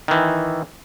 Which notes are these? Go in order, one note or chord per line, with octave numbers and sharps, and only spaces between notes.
D#3 E3